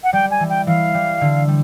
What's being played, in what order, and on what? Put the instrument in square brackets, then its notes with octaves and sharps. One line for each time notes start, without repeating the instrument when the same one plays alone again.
[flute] F#5
[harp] G3 [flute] G5
[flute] G#5
[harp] E3
[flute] G5
[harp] E3 [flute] F5
[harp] G3
D3
G3